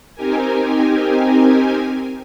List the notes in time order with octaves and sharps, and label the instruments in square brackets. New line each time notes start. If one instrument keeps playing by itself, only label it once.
[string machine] C4 D#4 G4 A#4 G#5